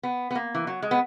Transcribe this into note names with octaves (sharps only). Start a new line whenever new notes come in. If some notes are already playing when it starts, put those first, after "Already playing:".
B3
B3
A#3
E3
F#3
G#3
B3